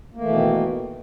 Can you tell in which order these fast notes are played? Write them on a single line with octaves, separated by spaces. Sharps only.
A#3 A3 E3 B2 D#3